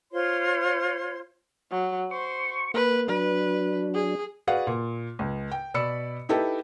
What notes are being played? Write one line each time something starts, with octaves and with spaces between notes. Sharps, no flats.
F4 C5 C#5 C6
F#3
C5 C#6
A#3 B4
F#3 D4 B4
G#4
F#4 G#4 B4 D5 F5 F#5
A#2
C#2
G5
B2 D5 B5 E6 C#7
D#4 E4 G4 A4 B4 G5